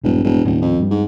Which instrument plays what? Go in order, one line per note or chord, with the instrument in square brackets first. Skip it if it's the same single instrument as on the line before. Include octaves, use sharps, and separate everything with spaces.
[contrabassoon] E1 [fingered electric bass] A#1 G2
[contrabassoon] E1
[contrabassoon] D#1 [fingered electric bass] D#2 A2
[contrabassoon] F2
[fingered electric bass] G2 G3
[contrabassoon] G#2